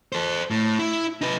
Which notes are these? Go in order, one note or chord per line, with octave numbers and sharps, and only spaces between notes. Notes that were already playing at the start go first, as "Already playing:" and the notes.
A4 C5
A2
E4
D#4 B4